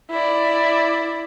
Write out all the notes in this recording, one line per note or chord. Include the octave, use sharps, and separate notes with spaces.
E4 D5